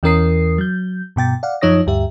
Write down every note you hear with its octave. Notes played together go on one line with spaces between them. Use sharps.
E2 E3 C#4 A#4 D#6 C7
F#3 G6
G2 B2 G5 A6
D5 F5 F#5
F#2 F3 D#4 C#5 D#6 A#6
D2 G2 G4 E5